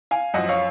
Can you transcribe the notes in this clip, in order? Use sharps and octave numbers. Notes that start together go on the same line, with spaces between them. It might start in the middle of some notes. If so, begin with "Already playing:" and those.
F5 G#5
F#2 F3 D#5 F#5
C#5 F5